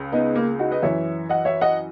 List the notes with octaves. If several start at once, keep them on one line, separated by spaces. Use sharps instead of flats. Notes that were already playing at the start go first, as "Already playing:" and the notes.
Already playing: C#2 C#3
B3 D#4
A#3
D#4 F#4
B4 D#5
F#2 E3 C#5 E5
D#5 F#5
C#5 E5
D#5 F#5